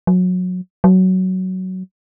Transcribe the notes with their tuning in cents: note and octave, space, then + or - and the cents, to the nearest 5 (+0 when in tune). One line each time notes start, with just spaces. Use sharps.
F#3 -25
F#3 +10